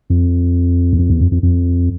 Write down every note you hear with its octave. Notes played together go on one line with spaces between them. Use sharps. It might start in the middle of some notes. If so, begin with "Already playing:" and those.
F2
E2
F2
E2
F2
F2
F2